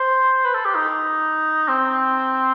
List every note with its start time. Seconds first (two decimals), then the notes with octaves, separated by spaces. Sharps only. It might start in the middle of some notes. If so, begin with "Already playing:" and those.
Already playing: C5
0.45 B4
0.54 A4
0.65 G4
0.75 D#4
1.68 C4